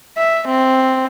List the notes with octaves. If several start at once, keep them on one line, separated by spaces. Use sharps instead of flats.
E5
C4